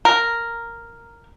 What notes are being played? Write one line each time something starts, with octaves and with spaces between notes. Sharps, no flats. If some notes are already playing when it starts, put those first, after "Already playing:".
A#4